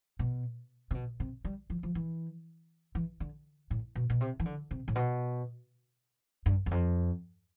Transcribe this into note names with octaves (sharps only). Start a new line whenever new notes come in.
B2
C3
B2
C3
G3
F3
F3
E3
E3
D3
A2
B2
B2
C3
E3
D3
C3
A2
B2
G2
E2
F2